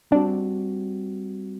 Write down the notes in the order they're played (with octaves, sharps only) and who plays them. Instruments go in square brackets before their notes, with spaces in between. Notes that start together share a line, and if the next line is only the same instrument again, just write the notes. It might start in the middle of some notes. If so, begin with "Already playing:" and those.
[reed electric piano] G3 C4 F#4 [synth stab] D4